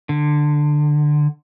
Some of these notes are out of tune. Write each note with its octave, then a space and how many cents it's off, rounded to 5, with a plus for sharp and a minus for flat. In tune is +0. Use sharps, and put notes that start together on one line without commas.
D3 +15